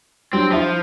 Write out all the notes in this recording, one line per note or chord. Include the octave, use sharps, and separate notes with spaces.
F#3 G3 C4 D4
F3 E4 E5